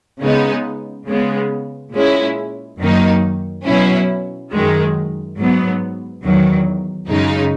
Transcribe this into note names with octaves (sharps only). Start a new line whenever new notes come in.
C#3 G#3 B3 D#4
C#3 G#3 B3
A#2 G#3 C#4 E4
F#2 D#3 F#3 A#3 D#4
B2 F#3 C#4 E4
F#2 D#3 G#3
G#2 F#3 B3
E2 D#3 F#3
F#2 C#3 G#3 D#4